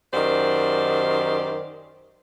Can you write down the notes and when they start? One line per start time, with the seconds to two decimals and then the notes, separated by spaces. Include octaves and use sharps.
0.13 F#2 D#3 G4 C5 D5